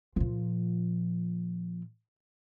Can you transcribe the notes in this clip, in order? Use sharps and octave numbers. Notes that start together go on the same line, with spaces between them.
A#2 F3